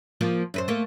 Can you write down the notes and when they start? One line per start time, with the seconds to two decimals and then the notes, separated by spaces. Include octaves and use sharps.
0.21 F3 A#3 F4
0.54 F#2 B4 C5
0.68 A3 A#3